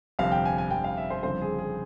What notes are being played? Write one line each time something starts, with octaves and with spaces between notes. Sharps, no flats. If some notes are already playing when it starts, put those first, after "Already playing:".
G1 F2 C3 F5
G5
G#5
G#5
G1 F2 C3 G5
F5
E5
C5
G1 F2 C#3 F3 C4 C5
G#4
G#4